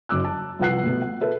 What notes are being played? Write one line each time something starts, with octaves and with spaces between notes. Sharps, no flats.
F#1 F#2 D6 E6 F#6
A5
C2 F3 B4 F#5 F#6 C7
B2 A3 B3
F#5
A4 B4 E5